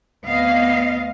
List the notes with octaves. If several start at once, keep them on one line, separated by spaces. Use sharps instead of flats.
D2 B3 C4 D#5 F5